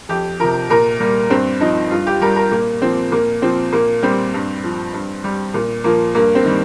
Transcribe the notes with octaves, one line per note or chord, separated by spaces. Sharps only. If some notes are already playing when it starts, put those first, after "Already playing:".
F2 G4
C3 F3 A#4
A#2 A#4
G3 A#3
G2 C4
F3 D#4
G2 F4
G4
G3 A#4
A#4
A#2 A#3
F3 C4
A#2 A#3
F3 C4
A#2 A#3
G3 C4
G2
F3
G2
G3
A#2
F3 A#3
G2 A#3
C4
D#3 G3